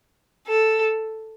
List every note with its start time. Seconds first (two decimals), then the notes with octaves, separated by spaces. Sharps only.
0.48 A4